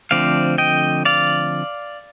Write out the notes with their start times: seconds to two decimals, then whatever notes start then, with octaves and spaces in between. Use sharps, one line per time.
0.11 D3 F3 A3 C4 D5 F5
0.58 D#5 G5
1.05 D5 F5